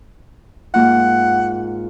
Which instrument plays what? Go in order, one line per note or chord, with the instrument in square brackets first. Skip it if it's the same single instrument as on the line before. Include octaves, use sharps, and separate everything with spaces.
[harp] G#2 A#3 F4 [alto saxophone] F#5